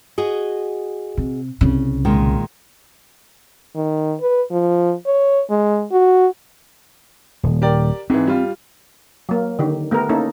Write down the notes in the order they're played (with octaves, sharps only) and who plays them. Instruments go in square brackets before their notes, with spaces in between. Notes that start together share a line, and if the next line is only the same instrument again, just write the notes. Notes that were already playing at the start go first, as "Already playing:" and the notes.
[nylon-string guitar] F#4 G#4 D#5
[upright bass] C3
C2 C#3
[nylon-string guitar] A#2 D#3 G#3
[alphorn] D#3
B4
F3
C#5
G#3
F#4
[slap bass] D#1
[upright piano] G4 A#4 D5
[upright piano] G#2 E3 [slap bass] C4
[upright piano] G3 F4
[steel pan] F#3 A#3
D3 D#3 G4
A3 B3 G4 A#4
A#3 C#4 D#4 E4 A4